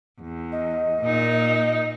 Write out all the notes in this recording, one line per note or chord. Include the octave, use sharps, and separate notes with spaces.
E2
D#5
A#2 D#4